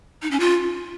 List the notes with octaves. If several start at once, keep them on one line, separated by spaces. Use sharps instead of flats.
D#4
C#4
F4